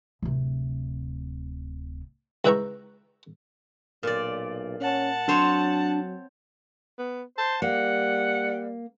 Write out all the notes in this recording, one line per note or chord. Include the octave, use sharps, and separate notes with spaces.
D1 C3
C#2 E4 B4 G5 A#5 C#6
B1 A#2 D5
C#4 F#5 A5
F#3 C4 D4 C5 C#5
B3
C5 A5
G3 A#3 F#5